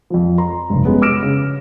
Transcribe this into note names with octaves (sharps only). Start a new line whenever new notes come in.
F2 F3
A#5 C6
F1 G2
G#3 B3 C#4
D6 E6 F6 A#6 D7 E7
C#3